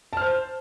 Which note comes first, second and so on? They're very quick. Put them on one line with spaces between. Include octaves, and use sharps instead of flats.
A5 F6 C5